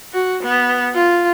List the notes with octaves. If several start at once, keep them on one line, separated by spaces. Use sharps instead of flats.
F#4
B3
F4